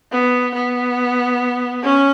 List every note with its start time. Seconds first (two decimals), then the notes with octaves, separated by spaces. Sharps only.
0.12 B3
0.55 B3
1.83 C#4